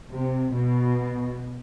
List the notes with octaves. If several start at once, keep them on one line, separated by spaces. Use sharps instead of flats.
C3
B2